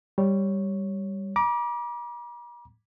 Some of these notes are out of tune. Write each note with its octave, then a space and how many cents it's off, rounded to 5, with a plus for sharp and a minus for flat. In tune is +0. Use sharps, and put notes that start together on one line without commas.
G3 +0 C#5 +0
A#5 +45 D6 +0